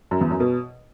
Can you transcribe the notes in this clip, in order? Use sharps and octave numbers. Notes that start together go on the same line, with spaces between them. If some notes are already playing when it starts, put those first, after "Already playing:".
F#2
E2
F#2
B2